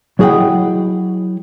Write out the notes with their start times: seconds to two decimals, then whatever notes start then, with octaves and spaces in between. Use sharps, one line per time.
0.19 F#3 E4 G#4 D#5 F#5 G5